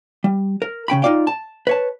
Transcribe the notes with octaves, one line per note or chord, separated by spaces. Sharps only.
G3
A#4
C#3 C#4 G5 B5
D#4 F4 A4 D5 F5 G5
A5
B4 C#5 A5